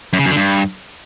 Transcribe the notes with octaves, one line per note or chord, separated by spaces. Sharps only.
F#2
C#3
F#2
D3
G2